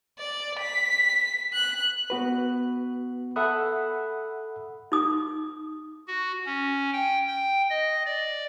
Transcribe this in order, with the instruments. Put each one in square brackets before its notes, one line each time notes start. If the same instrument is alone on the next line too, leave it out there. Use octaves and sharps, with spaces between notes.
[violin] D5
B6
F#6
[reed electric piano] B3 F#4 B4
A4 E5 F#5 B5 D#6 F#6
[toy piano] D#4 D#6
[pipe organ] F#4
C#4
G5
G5
D#5
D5